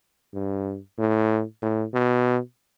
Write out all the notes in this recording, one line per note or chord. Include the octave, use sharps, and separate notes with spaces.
G2
A2
A2
B2